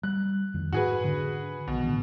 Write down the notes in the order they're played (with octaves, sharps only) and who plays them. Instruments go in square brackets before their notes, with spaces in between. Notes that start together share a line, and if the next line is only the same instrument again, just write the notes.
[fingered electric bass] G3 [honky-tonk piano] F#6
[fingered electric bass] F2 D#3
[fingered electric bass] G#2 [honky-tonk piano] F#4 G#4 B4
[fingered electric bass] D3 D4
[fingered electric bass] A#1 D#3 [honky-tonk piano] B2
[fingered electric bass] A2 D3 E3